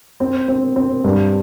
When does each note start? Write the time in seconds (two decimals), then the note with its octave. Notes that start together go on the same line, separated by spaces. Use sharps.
0.20 C4
0.48 C4
0.76 C4
1.04 G2